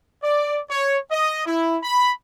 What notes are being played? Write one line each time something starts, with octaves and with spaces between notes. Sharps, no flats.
D5
C#5
D#5
E4
B5